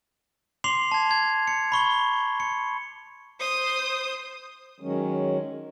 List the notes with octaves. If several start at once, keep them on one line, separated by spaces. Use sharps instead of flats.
C6 D6 C7 F7
A5 G#6
G#6
C#7
B5 C#6 G7
C#7
C5 D#6
D#3 F#3 G#3 C#4